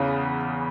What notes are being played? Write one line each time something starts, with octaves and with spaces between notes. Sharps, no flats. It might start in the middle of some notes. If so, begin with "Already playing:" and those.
Already playing: E2 C#3 E3